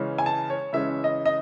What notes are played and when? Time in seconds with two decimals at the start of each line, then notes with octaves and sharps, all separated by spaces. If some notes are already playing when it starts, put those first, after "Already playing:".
Already playing: C#3 E3 G#3 C#4
0.18 G#5
0.26 A5
0.50 C#5
0.73 C#3 E3 G#3 C#4 E5
1.04 D#5
1.25 D#5